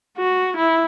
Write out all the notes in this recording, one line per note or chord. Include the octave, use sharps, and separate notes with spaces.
F#4
E4